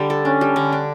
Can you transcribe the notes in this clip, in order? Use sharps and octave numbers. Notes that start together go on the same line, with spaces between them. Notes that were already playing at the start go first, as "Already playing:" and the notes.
Already playing: D3 G3
A4
C#4 D4
G3
D3
D4